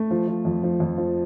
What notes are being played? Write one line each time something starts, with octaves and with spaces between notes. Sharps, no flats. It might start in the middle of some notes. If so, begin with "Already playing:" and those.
Already playing: A3
F3
F3
F2
F3
F2
F3